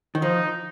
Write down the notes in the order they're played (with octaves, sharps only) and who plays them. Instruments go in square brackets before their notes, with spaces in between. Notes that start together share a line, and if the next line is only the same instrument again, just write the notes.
[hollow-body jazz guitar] D#3
[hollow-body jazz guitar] F3 [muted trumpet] D#4